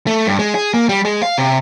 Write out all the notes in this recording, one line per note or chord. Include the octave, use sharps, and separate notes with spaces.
A3
G2
G#3
G#4
A#3
G3
G#3
F5
C3